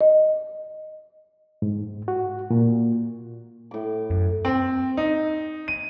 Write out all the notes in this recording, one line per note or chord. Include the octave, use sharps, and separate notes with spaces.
D#5
G#2
F#4
A#2
A2 D6
F#2
C4
D#4
D#7